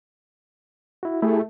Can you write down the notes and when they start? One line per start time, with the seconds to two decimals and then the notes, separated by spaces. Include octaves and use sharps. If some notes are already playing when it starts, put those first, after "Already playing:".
1.03 E4 F#4
1.22 A3 E4 G4 G#4